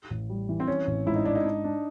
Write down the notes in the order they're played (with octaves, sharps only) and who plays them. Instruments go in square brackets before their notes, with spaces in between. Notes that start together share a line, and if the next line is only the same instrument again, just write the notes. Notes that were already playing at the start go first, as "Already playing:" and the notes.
[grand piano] A1
G3
E3
[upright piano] C4
[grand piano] E3 [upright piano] C#4
[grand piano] A1
[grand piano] G#2 [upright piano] E4
[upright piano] D#4
[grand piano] G#2 [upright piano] D4
[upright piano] D#4
[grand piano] D4
D4